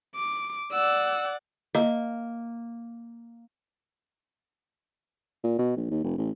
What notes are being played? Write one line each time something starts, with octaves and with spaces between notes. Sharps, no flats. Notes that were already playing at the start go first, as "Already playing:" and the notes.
D6
D5 F#5 E6
A#3 D#5
A#2
B2
A#1
D#2
F1
A1